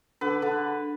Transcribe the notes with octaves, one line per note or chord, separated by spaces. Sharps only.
D3 B4
D3